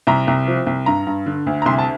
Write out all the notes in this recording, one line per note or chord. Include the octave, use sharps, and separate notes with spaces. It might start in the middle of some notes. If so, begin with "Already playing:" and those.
C2 A#5
C2
F3
C2
G2 A#5
G2
D3
D2
A#5
C2 C6
A5